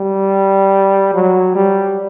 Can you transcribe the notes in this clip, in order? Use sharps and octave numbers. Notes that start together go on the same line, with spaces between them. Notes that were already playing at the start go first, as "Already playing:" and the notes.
Already playing: G3
F#3
G3